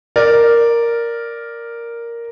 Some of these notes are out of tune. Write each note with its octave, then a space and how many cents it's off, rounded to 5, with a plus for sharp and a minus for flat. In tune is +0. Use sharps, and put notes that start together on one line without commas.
A#4 +0 D5 +0